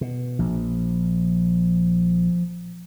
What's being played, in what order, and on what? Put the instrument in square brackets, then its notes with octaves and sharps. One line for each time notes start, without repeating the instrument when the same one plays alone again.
[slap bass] B2
[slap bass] A#1 [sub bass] F3